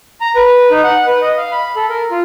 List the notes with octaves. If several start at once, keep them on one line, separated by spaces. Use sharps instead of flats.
A#5
B4
D#4
F#5
B4
D#5
F5
B5
A4
A#4
F4